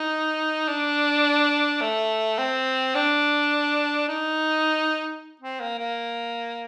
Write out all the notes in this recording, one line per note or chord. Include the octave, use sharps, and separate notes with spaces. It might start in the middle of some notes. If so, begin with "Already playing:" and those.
Already playing: D#4
D4
A3
C4
D4
D#4
C4
A#3
A#3